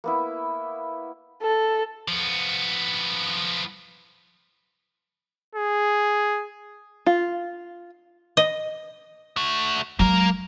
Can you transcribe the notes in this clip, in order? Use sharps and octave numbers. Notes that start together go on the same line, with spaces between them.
A#3 B3 E4
A4
F3 B3
G#4
F4
D#5
A3 F#4
F#3 G#3 A#3 A#4